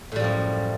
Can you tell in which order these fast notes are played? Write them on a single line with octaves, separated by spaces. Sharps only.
A2 G3 F3 F#2